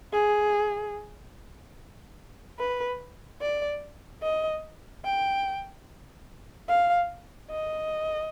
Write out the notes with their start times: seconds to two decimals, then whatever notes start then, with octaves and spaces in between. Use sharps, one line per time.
0.13 G#4
2.59 B4
3.41 D5
4.23 D#5
5.05 G5
6.69 F5
7.51 D#5